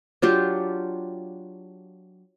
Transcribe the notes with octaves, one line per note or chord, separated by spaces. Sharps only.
F#3 D4 F4 G4